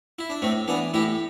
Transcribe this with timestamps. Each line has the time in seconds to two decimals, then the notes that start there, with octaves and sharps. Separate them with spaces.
0.19 E4
0.30 D4
0.42 A2 A3 C4
0.68 E3 B3 D4
0.94 A2 E4 G4